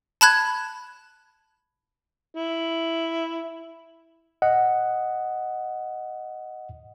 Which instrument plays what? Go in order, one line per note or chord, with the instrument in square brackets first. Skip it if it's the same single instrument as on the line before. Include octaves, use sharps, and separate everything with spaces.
[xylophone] A5 B5 F#6 G#6
[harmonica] E4
[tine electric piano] D#5 F#5